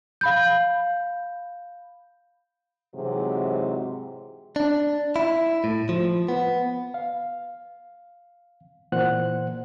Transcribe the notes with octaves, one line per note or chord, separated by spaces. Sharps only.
F5 B5 G6
G#2 C3 E3 F#3 G#3
D4
E4
A2
F3
B3
F5
A#2 E3 C5 F#5 F#6